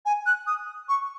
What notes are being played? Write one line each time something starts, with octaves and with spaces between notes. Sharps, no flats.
G#5
F#6
D#6
C#6